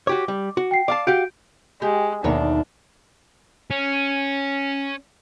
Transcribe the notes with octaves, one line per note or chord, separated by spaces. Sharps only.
F#4 G4 C#5 D6
G3
F#4
G5 C7
D5 F5 A5 D6
F#4 G4 F5 F#5 G6 D7
G#3 G4
D#2 B2 D4 A#4 C#5 E5
C#4